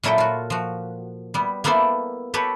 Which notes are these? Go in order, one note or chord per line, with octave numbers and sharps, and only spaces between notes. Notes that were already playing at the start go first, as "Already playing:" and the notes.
A#2 F#3 E4 A4 D#5 G5
F4 F#4
F3 F#4
G3 B3
A#3 B3 E4 A4 C5 D5
G4 A4 B4 C#5